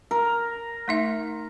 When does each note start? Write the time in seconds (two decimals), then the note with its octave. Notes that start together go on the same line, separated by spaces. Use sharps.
0.11 A#4
0.88 A3 D#4 E5